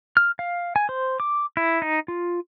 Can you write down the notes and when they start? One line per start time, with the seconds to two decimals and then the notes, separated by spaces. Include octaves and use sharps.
0.17 F6
0.39 F5
0.76 G#5
0.89 C5
1.20 D6
1.57 E4
1.82 D#4
2.08 F4